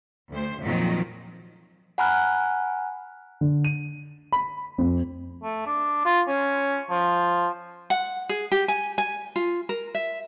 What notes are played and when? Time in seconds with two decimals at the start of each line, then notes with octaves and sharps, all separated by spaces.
0.31 D2 C5
0.63 F2 A#2 D#3 F3 F#3
1.98 F#5 G#5 A#5 B5 F6 F#6
3.41 D3
3.65 D#7
4.32 B5
4.78 F2
5.44 A3
5.67 D4
6.05 F4
6.28 C#4
6.90 F3
7.90 F#5
8.29 G#4
8.52 G4
8.68 G#5
8.98 G#5
9.36 F4
9.69 A#4
9.95 E5